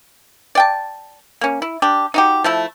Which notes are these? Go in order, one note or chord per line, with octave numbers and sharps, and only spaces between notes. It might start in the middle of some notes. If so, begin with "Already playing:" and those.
D5 G5 A5
A#3 C#4
E4
D4 G4
D#4 F#4 G4
F3 A3 E4